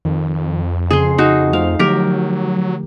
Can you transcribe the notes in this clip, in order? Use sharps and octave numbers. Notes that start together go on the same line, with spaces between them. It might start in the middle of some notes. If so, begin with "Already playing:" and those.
F2 D#3
C#3 G#4 C6
D#4 F#4
A3 F4 C5 F5
D3 F3 F#3 A3 G4 A#4